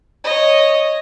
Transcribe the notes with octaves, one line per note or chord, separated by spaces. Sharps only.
C#5 D#5